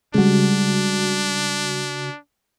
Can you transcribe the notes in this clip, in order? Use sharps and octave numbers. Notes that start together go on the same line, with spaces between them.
C#3 G3 G#3 D4 F#4